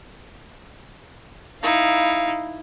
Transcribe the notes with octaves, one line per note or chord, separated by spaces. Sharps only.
D#4 E4 F5